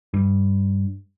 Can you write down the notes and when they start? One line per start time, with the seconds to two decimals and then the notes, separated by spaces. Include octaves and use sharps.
0.14 G2